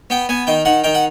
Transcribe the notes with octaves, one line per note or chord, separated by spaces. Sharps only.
B3 G5
B3 G#5
D#3 G5
D#3 F#5
D#3 G5
F#5